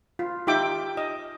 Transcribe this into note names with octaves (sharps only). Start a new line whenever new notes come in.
F4
D#4 F4 G4 E5 G5 D6
D#5